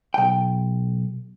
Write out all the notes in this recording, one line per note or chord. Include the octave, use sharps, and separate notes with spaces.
B1 G5